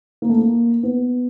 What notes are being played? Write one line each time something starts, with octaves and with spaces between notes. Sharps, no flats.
A#3
A3
A#3
B3